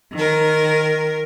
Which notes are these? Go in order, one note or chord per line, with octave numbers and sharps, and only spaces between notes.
D#3 A#4